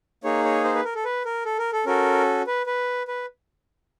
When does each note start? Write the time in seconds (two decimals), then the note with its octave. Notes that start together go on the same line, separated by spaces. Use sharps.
0.24 A#3 D#4 G#4 C#5
0.45 C#5
0.64 C5
0.75 B4
0.85 A#4
0.95 A4
1.05 B4
1.25 A#4
1.45 A4
1.58 A#4
1.73 A4
1.86 C#4 F#4 A4 A#4
2.47 B4
2.66 B4
3.08 B4